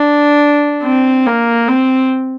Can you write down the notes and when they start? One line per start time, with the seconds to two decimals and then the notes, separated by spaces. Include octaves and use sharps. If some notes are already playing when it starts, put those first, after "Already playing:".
Already playing: D4
0.83 C4
1.26 A#3
1.68 C4